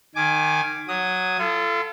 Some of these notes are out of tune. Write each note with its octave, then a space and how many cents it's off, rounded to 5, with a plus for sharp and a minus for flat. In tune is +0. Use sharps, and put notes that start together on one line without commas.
D#3 -15 G#5 +0 D6 +0
F#3 +0 D#6 +0
F4 -35 A4 +0